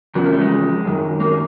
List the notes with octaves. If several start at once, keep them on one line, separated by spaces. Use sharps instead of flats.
E2 C#3 F3 B3
A#3
A3
G#3
F#2 D#3
A#3